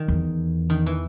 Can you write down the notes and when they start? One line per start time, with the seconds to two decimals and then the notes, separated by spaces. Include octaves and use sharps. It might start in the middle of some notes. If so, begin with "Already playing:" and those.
Already playing: D#3
0.08 E2
0.70 D#3
0.86 E3